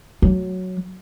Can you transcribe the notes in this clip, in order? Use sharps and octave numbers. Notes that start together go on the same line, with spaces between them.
F#3